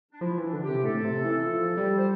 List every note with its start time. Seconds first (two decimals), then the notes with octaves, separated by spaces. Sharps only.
0.12 D4
0.21 F3 E4
0.38 E3 D4
0.53 D3
0.63 G4
0.68 C3
0.83 A2 A4
1.04 C3
1.25 E3
1.46 F3
1.77 G3
1.97 C5